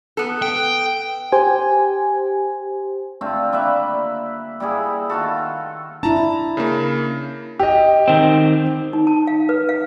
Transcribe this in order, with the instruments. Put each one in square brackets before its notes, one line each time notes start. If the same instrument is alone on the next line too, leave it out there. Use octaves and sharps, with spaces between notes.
[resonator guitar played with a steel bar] B3 A4
[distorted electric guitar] G5
[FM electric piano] G4 C5 G#5
[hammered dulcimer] D3 A3 C4 F4
G3 A#3 B4 E5
G3 A#3 E4 G#4
D#3 F4 F#4 A4
[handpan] D4 E4 [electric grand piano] A5 A#5
[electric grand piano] C#3 A#3
[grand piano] G4 D#5
[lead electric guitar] D#3 C4
[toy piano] D#4
A5
F5
B4
F5